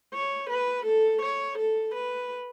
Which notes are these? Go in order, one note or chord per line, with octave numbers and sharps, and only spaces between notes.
C#5
B4
A4
C#5
A4
B4